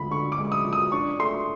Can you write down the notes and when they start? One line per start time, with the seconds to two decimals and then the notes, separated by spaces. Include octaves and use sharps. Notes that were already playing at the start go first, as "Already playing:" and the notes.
Already playing: D2 F3 G#3 B5
0.10 D3 C#6
0.32 D6
0.38 G#3
0.52 D#6
0.65 F3
0.73 D#6
0.92 D4 C#6
1.20 A3 C6